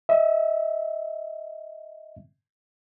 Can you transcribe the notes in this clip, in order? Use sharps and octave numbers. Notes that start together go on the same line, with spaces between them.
D#5 E5